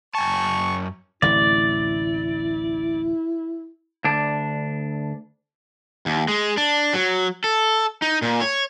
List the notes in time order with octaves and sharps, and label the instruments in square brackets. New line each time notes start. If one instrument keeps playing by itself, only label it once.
[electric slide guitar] F#2 G#5 A5 [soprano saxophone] C#6
[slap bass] D1 A1 C3 [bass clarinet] E4 [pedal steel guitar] D5
[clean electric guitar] D2 D4
[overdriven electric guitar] D#2
G#3
D4
F#3
A4
D#4
A#2
C#5